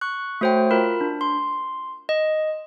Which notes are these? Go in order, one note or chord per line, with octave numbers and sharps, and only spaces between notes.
C#6 F#6
A3 F#4 C5 C#5 G5
F4 A#4 B5
D4
C6
D#5